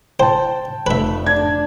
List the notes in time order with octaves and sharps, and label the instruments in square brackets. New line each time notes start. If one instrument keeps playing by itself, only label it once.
[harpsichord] C5 [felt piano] G5 A5
[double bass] F1 A3 [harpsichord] B4 E5
[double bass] D4 [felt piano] G#6